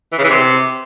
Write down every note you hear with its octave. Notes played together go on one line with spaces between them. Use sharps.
E3
C#3
E3
C3